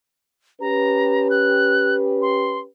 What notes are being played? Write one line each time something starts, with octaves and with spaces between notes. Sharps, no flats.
C#4 G4 B4 A#5
F#6
C6